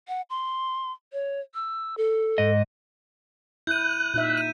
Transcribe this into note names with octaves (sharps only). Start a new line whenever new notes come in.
F#5
C6
C#5
E6
A4
G#2 D#5
E4 F#6 G6 D#7
A#2 D#4 E5
D#7